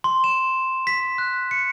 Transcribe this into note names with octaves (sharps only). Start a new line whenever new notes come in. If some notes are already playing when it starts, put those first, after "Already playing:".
C6
E7
B6
F#6
C#7